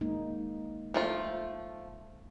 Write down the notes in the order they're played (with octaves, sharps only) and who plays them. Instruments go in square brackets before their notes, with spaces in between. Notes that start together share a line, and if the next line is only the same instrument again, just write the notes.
[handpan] G#3 A#3 D#4
[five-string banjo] F3 A3 F4